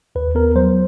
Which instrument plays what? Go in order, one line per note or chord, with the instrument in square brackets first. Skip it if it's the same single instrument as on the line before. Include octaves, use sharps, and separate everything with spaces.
[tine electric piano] D#2 B4
B3 A#4
F#3 C5